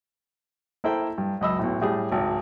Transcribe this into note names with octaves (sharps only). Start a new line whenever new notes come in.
A#3 E4 A4 C5 G5
G2
C#2 F#2 D#5 B5 E6
B1 A2
A2 G3 G#4
G#1 C#2